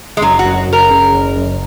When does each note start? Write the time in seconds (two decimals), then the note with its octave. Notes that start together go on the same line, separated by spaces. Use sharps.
0.17 G#3
0.21 F#1 F#3
0.39 F#4
0.45 F#2
0.68 F#1 A#4
0.90 C#3
1.13 F#1
1.36 F#2